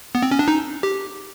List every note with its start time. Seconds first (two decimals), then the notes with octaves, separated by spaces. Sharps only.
0.15 B3
0.22 C4
0.31 C#4
0.39 D4
0.48 D#4
0.83 G4